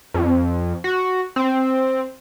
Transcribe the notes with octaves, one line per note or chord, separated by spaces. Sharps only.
F2
F#4
C4